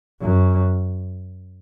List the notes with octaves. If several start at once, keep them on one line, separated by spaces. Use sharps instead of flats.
F#2